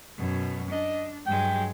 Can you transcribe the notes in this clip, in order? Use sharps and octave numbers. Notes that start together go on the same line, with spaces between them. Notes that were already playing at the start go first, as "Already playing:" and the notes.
F#2 B2
D4 D#5
G2 F#3 G#3 G5